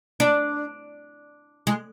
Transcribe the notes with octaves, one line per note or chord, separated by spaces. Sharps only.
D4
G#3